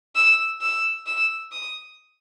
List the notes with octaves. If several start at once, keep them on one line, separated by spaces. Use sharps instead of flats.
E6
E6
E6
D#6